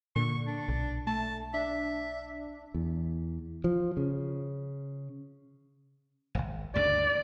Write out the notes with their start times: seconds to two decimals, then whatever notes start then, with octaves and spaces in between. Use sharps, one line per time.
0.16 A#2 D3 C#6
0.47 D4
0.69 B1
1.07 A3 A5
1.54 D4 E5
2.74 E2
3.64 F3
3.97 C#3
6.35 D#1 G#1
6.76 D2 G2 C#3 D5